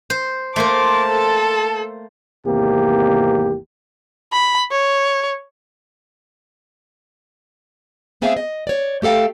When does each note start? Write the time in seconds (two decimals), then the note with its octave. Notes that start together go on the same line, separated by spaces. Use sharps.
0.10 C5
0.56 A3 A#3 A#4 C5 A5 D6
1.09 A4
2.46 G#1 E2 C3 A#3 G4
4.33 B5
4.72 C#5
8.21 A3 B3 C4 G#4 E5 F5
8.37 D#5
8.67 C#5 D5
9.02 A3 G4 A4 F5 G5